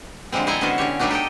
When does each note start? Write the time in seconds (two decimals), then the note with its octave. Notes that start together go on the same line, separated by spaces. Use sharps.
0.32 D3 F3 G3 G#3 C4
0.47 C4 E4 A4 D#5 G#5 A#5
0.61 D3 G#3 B3 C#4 F#4 C5
0.78 D3 C#4 G4 C#5
0.99 F#3 G3 A3 D4 D#4 F#4
1.11 G4 A4 D#5 G5